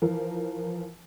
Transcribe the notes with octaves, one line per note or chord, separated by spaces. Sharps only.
E3 F3 A#4